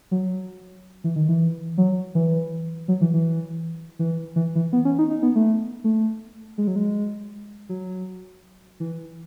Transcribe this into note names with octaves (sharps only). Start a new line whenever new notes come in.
F#3
E3
D#3
E3
F#3
E3
F#3
E3
E3
E3
E3
E3
B3
C#4
D#4
D#4
B3
A3
A3
G#3
F#3
G#3
F#3
E3